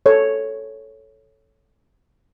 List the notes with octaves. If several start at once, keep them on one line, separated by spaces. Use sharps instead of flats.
A4 C#5